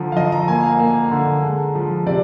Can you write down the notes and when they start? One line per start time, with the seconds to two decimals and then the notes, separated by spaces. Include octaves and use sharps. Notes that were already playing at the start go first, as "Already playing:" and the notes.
Already playing: D3 F3 A#5
0.12 F5
0.17 F3 D#5
0.32 A#5
0.48 A#3 G#5
0.64 F5
0.79 A#3
1.11 D3
1.43 G#3
1.75 F3
2.06 C3 D5